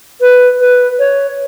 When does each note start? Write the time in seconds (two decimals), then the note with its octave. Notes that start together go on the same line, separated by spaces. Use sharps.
0.21 B4
0.60 B4
0.99 C#5